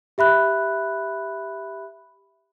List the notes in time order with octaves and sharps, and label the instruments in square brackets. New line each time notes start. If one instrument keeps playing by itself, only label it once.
[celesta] G4 E5 B5 F#6